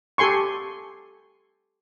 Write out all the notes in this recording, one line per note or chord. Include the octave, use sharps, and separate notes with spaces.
G4 A4 G#5 C6 C#6